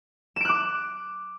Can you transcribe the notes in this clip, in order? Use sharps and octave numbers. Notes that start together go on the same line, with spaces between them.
D6 F#6 D7 E7